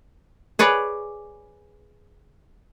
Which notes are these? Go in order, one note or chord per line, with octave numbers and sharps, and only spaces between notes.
G#4 B4 C#5 D5